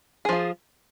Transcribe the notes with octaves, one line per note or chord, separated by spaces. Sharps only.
F3 F4 G#4